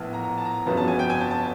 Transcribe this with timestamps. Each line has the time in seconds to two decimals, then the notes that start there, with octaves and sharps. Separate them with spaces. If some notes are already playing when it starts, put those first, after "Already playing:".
Already playing: A#1 A2 F3 B3
0.13 A#5
0.24 A#5
0.37 A5
0.45 A#5
0.66 G1 F2 C#3 F#3 B3 A5
0.77 A5
0.88 G#5
0.99 G5
1.10 G#5
1.21 A5
1.31 A5